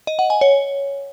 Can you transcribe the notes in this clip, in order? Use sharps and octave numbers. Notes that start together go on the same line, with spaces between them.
D#5
F#5
G#5
C#5